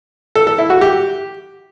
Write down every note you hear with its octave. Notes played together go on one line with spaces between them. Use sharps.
A4
A4
E4
F#4
G4